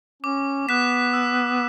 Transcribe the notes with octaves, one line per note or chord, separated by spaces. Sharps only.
C#4 D6
B3 F#6 B6 E7
E6